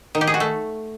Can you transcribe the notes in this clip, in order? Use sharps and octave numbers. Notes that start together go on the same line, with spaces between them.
D#3
G4
G#4
F#4
A3